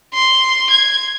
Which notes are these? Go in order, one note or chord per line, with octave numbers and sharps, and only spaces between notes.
C6
G#6